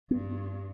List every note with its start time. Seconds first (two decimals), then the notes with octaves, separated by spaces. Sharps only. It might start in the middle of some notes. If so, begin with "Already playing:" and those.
0.10 G2 B3